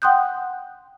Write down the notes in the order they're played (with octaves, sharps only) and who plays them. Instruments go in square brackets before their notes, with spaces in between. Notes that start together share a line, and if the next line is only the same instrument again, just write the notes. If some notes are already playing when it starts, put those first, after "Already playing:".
[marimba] F#5 G5 C6 D#6 F#6 G6